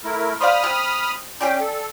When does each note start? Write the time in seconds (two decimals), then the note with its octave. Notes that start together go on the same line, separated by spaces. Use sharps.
0.04 A3 E4 A#4
0.41 C5 D5 F5 B5 D#6 F6
0.64 C3
1.41 C#4 G4 G#4 D5 G5
1.60 A4